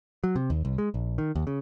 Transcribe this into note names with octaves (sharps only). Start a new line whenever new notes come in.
F#3
C3
D#2
C2
G#3
A#1
D#3
D#2
C#3